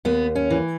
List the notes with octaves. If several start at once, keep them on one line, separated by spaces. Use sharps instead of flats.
D#2 B3
C#4
E3